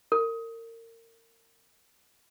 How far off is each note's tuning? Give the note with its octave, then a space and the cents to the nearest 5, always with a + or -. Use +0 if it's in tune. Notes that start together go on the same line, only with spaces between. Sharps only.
A#4 -30